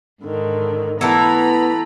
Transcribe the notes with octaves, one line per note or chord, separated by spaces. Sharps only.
G#2 D3 D#3
E3 A3 B3 A#5 B5